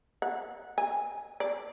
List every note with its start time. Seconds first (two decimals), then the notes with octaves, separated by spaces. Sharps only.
0.22 F#5
0.78 G#5
1.40 D5